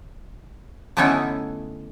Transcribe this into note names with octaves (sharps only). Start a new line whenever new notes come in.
D3 A3 B3 C#4 D#4 E4